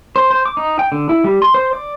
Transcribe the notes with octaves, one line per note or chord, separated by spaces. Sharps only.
C5
C5
D6
D#4
G5
D3
E4
G3
C6
C5
D5